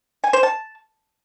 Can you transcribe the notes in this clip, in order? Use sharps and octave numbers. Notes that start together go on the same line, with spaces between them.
G#5
C5
A5